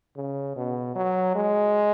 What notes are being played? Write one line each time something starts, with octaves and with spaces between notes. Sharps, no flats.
C#3
B2
F#3
G#3